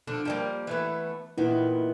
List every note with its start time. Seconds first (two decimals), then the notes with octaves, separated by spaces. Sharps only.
0.07 D3 F3 D4
0.25 F3 G3 A#3
0.67 E3 A3 B3
1.38 A#2 D#3 B3 E4